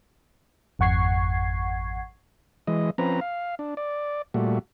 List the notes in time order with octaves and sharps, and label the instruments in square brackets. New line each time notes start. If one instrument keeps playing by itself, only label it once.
[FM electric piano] G#1 F2 F#5 C#6 G#6 C7
[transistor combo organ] E3 G#3 D#5
F3 C4 C#4 B4 A#5
F5
D4
D5
A#2 G3 A3 F#4